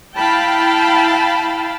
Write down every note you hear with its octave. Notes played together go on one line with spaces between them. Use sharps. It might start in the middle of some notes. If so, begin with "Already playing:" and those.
E4 F5 G5 A5 B5